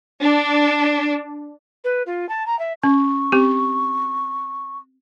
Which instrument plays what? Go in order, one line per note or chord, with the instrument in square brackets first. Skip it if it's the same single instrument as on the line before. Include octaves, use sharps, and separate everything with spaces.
[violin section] D4
[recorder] B4
F4
A5
A#5
E5
[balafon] C#4 [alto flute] C#6
[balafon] C4 G4